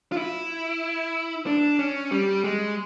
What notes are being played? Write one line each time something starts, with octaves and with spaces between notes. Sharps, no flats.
F4
E4
D4
C#4
G3
G#3